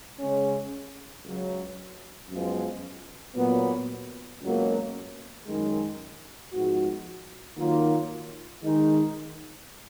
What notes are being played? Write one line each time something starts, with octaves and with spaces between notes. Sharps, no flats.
C#3 G#3 C#4
C#2 C#3 F#3
F#2 F3 G#3 B3 F4
A#2 F#3 B3
C#2 B2 F#3 A#3
F#2 D#3 G#3
G#2 F3 G#3 B3 F#4
D#3 F#3 A#3 F4
D#3 G#3 D#4